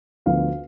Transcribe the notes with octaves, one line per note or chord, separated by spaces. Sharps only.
D2 D3 F3 B3 D4 F5